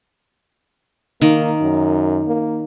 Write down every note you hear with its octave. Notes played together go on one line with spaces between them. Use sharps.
D#3 A#3
F#2
A#3